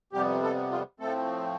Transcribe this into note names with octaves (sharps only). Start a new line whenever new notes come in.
F2 C3 G3 B3 G4
A4
F4
A2 F3 A3 C4 A4